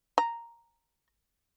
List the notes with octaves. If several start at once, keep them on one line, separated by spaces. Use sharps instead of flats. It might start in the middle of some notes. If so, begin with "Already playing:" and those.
A#5